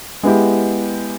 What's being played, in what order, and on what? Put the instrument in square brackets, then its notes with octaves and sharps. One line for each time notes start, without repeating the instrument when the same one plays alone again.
[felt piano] G#3 B3 E4 G4